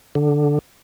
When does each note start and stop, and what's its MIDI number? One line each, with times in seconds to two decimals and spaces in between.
0.15 0.59 50